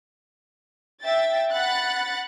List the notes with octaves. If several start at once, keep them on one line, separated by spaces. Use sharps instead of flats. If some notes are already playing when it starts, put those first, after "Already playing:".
E5 G5 A6
F#5 B5 F#6 A6